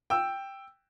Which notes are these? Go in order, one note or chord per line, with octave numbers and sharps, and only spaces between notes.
G5 E6